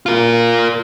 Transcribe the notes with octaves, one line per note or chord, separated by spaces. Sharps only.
F4 A#4